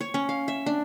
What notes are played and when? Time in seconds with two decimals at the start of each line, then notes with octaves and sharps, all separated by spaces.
0.01 C#5
0.14 C#4
0.29 F5
0.48 E5
0.66 D4